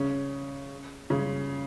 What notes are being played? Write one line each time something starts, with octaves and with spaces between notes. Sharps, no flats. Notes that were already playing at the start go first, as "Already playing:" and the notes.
Already playing: C#3 C#4
C#3 C#4